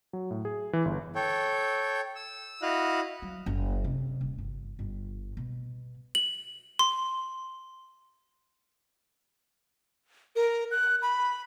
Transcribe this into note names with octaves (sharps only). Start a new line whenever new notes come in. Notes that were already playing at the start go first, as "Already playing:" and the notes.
F#3
A2
G#4
E3
G1
A4 C#5 G5
E6
E4 F#4 D#5 F5 F#6
F#3
F#1
C3
D#1
G1
G1
B2
F#7
C6
A#4
F#6
B5